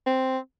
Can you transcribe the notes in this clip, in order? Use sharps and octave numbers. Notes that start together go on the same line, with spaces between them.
C4